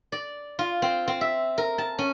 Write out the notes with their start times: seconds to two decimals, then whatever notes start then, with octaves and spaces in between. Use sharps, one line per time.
0.12 D5
0.59 F4
0.82 C4
1.08 C4
1.21 E5
1.58 A#4
1.78 A5
1.99 C#4